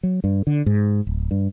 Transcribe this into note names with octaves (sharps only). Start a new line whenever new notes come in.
F#3
G2
D3
G#2
D1
G2